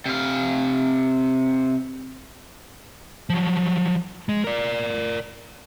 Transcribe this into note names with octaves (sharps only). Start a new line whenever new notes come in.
C3 F5
F3 F#3
G#3
A#4 D5